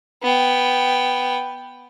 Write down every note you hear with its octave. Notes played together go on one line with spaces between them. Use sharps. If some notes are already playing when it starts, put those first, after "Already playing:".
B3 G5